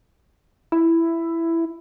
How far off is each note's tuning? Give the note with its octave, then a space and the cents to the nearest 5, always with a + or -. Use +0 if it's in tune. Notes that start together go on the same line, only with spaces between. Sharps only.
E4 +10